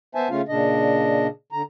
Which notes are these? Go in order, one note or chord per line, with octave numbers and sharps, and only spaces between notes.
B3 C5 E5 G#5 A5
C#3 A3 C#4 F4 F5
A#2 C#3 D4 D#5
D3 A#5